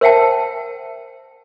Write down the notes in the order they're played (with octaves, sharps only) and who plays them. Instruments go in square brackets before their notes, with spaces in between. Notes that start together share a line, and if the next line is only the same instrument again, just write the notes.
[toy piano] A#4 C5 E5 F#5 G5 A5